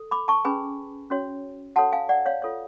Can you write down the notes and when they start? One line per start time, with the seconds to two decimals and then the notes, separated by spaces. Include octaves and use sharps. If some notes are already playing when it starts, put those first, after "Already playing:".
Already playing: A4
0.11 B5 D6
0.28 A5 C#6
0.45 C#4 G#4 B4 G#5 B5
1.10 C#4 F#4 C#5
1.76 F#4 A4 C#5 F#5 A5
1.92 F5 G#5
2.09 D5 F#5
2.26 C#5 F5
2.42 F4 A4 C#5